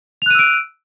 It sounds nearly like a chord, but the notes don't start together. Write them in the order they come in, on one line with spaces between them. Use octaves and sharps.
F7 F#6 D#7 E6 D7